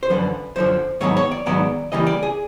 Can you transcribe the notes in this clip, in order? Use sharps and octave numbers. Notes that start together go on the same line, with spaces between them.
C5
F#2 D3 F3 B4
F#2 D3 F3 C5
G#2 D#3 F#3 B3 C#5
C#5
D5
G#2 D#3 F#3 B3 D5
C#3 E3 G3 A#3 D#5
D5
G#4